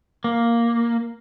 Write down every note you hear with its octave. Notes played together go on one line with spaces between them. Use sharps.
A#3